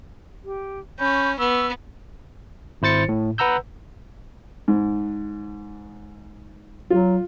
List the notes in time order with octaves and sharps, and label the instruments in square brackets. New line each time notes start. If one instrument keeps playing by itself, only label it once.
[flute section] G4
[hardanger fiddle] C#4 [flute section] B5 C#6 G6
[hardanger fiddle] B3 [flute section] C#6 E6
[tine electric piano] G#1 E4 C5 A6 C#7
A2
B4 F#5 A#5 E6 G6
[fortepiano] G#2
[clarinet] F#3 [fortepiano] F4